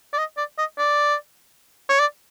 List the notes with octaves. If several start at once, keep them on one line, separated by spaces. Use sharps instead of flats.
D5
D#5
D5
D#5
D5
C#5
D5